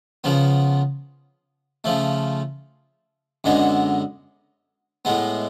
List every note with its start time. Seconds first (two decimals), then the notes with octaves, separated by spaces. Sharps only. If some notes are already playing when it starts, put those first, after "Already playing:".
0.24 C#3 F3 B3
1.84 C#3 F3 A3
3.44 F#2 D3 G#3 B3
5.05 A2 G#3 B3